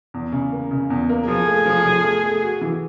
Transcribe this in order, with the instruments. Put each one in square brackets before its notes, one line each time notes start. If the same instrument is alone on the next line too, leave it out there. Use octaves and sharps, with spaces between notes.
[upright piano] E2
C#3
A#3
C#3
E2
A#3
[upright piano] F3 [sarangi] G#4
[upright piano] A3
F3
F3
A3
A3
F#4
E3